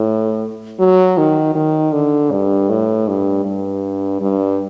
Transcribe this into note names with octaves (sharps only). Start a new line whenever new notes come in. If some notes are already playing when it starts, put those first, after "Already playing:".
Already playing: A2
F#3
D#3
D#3
D3
G2
A2
G2
G2
G2